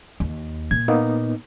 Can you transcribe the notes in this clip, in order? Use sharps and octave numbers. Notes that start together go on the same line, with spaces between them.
D#2
A#2 G#6
A#3 B3 D#4